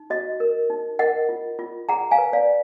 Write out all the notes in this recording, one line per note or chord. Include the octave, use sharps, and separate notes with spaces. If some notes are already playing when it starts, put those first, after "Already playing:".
Already playing: D#4
F#4 D#5
A#4
D#4
A#4 D#5 F#5
F4
F4
G#4 F#5 A#5
F5 G#5
B4
D5 F5